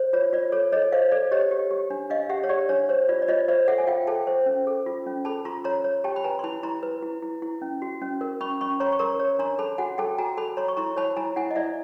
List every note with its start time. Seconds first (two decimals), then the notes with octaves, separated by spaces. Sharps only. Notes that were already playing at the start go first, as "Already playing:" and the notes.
Already playing: C5
0.13 F4 C#5
0.33 F4 D5
0.52 A4 C#5
0.72 A4 C#5 D#5
0.92 C5 D#5 F5
1.11 A4 D5
1.31 G4 C#5 D#5
1.51 G4
1.71 G4
1.90 D4
2.10 D4 D#5 F5
2.29 G4 E5 F#5
2.43 C#5
2.49 G4 D5
2.69 D4 C#5
2.89 C5 C#5
3.09 F4 D5
3.22 D5
3.28 F4 C#5 D#5
3.48 C5 D5 E5
3.68 A4 E5 F#5
3.78 G#5
3.87 F4 F5 G5
4.07 A4 G5 A5
4.27 C5
4.46 C#4
4.67 A4
4.86 F4
5.06 C#4
5.25 A4 A5 B5
5.45 F4 A#5 C6
5.64 C#5 A#5 C6
5.84 C#5
6.04 G4 G5 A5
6.16 B5
6.24 B4 G#5 A#5
6.39 C6
6.44 E4 A5 B5
6.63 E4 A#5 C6
6.83 B4
7.03 E4
7.22 E4
7.42 E4
7.62 C#4
7.82 F#4
8.02 C#4
8.21 A#4
8.40 C#4 B5 C#6
8.61 C#4 B5 C#6
8.80 C#5 A#5 C6
8.92 C#6
8.99 A#4 A#5 C6
9.20 C#5
9.39 D4 A#5 C6
9.59 A4 A5 B5
9.78 F#4 F#5 G#5
9.98 A4 G5 A5
10.18 F#4 G#5 A#5
10.37 A4 A5 B5
10.57 C#5 A#5 C6
10.68 C#6
10.77 E4 A#5 C6
10.96 C#5 A5 B5
11.16 E4 G#5 A#5
11.36 E4 F#5 G#5
11.51 D#5
11.56 E4 D5 E5